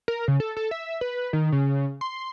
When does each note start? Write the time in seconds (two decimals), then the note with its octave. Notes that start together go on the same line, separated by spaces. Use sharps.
0.08 A#4
0.28 C#3
0.40 A4
0.57 A4
0.71 E5
1.01 B4
1.33 D#3
1.52 C#3
2.01 C6